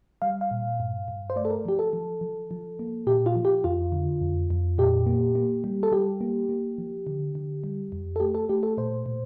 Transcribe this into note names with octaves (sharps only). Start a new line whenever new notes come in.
G3 F5
F5
A#2
G2
G2
C5
A3 D5
A4
A#4
F3 G4
A4
F3
F3
F3
A#3
A#2 G4
F4
F3
G4
F2 F4
D3
F2
F2
A#2 G4
A#3
A#3
G3
A4
G3 G4
A#3
A#3
F3
D3
D3
G3
F2
A4
A3 G4
A4
A3 G4
A4
A#2 C5
A#2